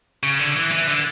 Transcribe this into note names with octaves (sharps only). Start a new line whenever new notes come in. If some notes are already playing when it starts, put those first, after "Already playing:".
C#3
D3
E3
E3
D3